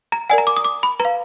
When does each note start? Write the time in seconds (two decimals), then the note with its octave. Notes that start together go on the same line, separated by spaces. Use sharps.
0.12 A#5
0.30 A#4 D5 F#5 G#5
0.38 A#5
0.47 D6
0.57 D#6
0.65 D6
0.83 B5
1.00 B4 A#5
1.05 F5